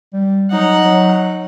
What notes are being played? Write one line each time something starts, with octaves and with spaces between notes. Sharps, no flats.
G3
F#3 D#4 F#5
F#3